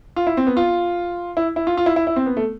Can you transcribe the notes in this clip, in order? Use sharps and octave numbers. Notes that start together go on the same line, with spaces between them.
F4
E4
C4
B3
F4
E4
E4
F4
F4
E4
E4
E4
C4
B3
A3